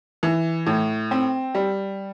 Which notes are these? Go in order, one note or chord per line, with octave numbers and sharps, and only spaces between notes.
E3
A2
C4
G3